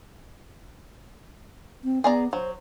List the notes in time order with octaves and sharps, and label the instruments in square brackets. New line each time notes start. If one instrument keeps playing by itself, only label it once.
[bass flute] C4
[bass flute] B3 [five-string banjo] G#4 D5 A#5
[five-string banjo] F#3 [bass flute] C5